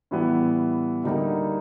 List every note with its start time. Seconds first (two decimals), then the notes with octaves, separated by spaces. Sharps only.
0.11 A2 E3 G3 B3
1.03 D2 D3 G3 A#3 D#4